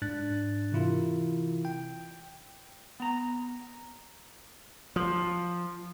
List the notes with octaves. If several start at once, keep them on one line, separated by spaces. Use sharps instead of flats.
G#2 D4 F#6 A6
C3 E3 E4 F4 A#4
G5
B3 A#5
F3